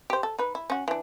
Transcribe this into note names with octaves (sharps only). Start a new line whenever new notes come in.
G4 C5
A4
D#4 B4
E4
C#4 F#4
E3 D4